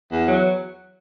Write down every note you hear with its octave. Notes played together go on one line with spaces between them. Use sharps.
E2
F#3